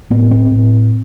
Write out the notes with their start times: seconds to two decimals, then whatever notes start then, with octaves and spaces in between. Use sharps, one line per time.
0.10 A2 B3
0.31 C4
0.52 A2